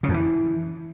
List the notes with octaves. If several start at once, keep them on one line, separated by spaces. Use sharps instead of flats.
C#3
F2
E3